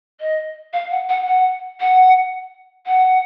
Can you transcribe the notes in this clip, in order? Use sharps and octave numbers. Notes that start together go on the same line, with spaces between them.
D#5
F5
F#5
F#5
F#5
F#5
F#5